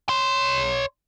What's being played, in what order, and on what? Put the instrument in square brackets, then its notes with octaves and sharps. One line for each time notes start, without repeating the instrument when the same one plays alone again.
[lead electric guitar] C#5 C6